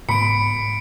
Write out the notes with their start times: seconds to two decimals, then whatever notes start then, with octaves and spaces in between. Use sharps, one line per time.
0.09 G#2 B3 B5 C#7 D7